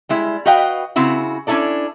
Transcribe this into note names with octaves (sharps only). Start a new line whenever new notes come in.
G3 G#3 E4
F#4 B4 D#5 F5 G5
C#3 C4 E4 F#4
C#4 D4 E4 A4 D5